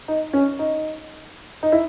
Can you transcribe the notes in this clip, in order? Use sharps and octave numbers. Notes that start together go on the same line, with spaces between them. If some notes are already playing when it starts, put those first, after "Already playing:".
D#4
C#4
D#4
D#4
E4